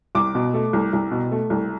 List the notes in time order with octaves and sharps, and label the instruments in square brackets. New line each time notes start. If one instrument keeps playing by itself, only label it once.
[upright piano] C2 D6
B2
A3
C2
C2
B2
A3
C2